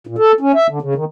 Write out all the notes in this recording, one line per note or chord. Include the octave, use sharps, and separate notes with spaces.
A#2
A4
C#4
E5
D3
C#3
D#3